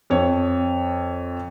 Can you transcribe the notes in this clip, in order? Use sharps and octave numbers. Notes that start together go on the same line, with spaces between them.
F2 C#5